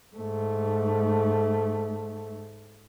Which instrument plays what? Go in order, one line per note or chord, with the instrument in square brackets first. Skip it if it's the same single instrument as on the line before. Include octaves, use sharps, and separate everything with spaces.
[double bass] G#2 A3